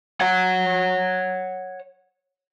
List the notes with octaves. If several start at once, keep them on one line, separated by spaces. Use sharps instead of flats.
C#5 F#5